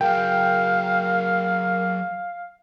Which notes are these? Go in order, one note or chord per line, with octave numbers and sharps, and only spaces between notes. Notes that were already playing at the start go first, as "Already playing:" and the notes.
F#3 G#4 A#4 F5 G5